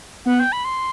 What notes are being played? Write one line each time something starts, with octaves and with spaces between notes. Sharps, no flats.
B3 F#5
G5
B5
C6